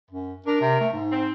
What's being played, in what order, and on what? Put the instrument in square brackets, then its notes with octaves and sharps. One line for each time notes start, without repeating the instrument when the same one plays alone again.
[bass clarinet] F#2
[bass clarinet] D4 [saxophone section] A#4
[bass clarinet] C3
A3
G#2
[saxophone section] C4